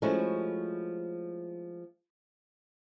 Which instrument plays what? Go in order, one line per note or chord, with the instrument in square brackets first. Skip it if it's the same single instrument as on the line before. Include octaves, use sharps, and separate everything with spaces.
[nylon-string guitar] F3 G#3 A3 C#4 E4 F#4